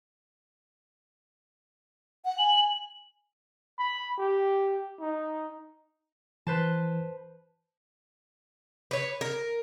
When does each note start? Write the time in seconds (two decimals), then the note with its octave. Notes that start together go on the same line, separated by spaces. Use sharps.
2.25 F#5
2.38 G#5 F#7
3.79 B5
4.18 G4
5.00 D#4
6.47 E3 B4 C5 A5
8.91 B4 C#5
9.21 A#4